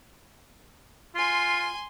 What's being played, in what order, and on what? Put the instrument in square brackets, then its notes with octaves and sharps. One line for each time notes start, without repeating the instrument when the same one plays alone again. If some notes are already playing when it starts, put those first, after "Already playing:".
[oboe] F4 [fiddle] G#5 C6